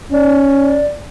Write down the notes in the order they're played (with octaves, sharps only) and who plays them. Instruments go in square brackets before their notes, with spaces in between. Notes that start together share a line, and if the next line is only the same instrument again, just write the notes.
[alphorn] C#4 [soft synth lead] D5